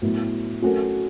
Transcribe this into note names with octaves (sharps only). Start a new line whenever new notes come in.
A2 F#3 B3 E4
F#3 A3 C#4 F#4 A#4